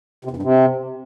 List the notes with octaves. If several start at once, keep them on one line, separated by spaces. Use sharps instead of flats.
C3
E2
G2
C3